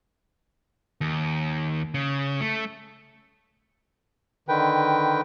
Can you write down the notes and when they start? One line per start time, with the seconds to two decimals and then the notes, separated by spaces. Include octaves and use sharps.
1.01 D#2
1.94 C#3
2.41 A3
4.49 D3 D#3 B4 G5